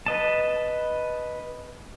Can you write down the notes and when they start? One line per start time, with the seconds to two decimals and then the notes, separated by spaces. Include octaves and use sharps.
0.06 B4 D#5 A5